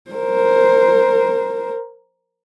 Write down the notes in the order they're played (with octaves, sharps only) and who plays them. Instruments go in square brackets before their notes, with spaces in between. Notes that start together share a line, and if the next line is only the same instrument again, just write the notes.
[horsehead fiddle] A#4 C5